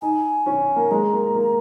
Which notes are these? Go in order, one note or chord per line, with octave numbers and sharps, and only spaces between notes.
D#4 G#5
C#4
A#3
G#3 A#5
A#3
A#3